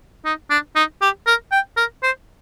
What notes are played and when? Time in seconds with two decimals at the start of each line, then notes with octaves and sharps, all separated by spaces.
0.25 D#4
0.50 D4
0.76 D#4
1.01 G4
1.27 A#4
1.52 G5
1.77 A#4
2.03 C5